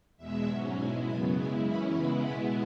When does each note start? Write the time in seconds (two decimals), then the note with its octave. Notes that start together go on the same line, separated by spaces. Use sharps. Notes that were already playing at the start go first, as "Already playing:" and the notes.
0.18 E2 B2 G#3 E5
0.47 G#2 F#3 C#4
0.76 B2 G#3 E4 G#5
1.06 F#2 C#3 F#3 B3 B5
1.35 C#3 G#3 E4 G#5
1.65 F#2 E3 C#4 E4 B5
1.94 C#3 G#3 B3 E4 B5
2.23 B2 G#3 B3 E4 B5